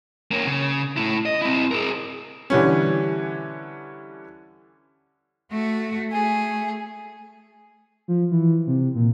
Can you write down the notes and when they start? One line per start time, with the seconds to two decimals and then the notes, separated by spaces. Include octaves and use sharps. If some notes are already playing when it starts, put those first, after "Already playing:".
0.31 A#3 C#4
0.46 C#3
0.97 A3 E4
1.26 D#5
1.42 C4 E4
1.71 G#4 A#4
2.50 D3 E3 G3 C#4
5.51 A3 F#4
6.12 A3 G#4
8.08 F3
8.31 E3
8.67 C3
8.95 A#2